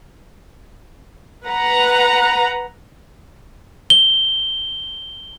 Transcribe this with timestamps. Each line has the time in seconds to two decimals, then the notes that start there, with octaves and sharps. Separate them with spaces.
1.45 B4 F#5 A#5
3.90 G7